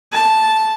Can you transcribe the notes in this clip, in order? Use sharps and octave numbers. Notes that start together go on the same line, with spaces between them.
A5